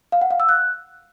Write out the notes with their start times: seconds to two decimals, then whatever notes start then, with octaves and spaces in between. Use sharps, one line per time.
0.12 F5
0.21 F#5
0.31 F5
0.40 E6
0.49 F#6